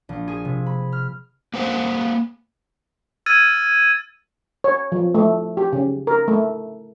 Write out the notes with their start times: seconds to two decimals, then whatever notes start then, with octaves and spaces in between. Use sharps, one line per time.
0.09 A#1
0.28 G#4
0.45 C3
0.66 B5
0.92 F6
1.54 A#3 B4 C5 F#5
3.26 E6 F6 G#6 A6 D#7
4.64 C#5
4.92 F3
5.15 A3
5.57 G4
5.73 C#3
6.07 A#4
6.28 A3